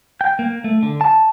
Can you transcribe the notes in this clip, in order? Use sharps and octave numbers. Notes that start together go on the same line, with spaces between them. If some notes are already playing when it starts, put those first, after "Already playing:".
G5
A#3
A3
D3
A5